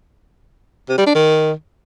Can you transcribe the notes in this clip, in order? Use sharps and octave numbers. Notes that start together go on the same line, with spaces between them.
C3
G3
D4
D#3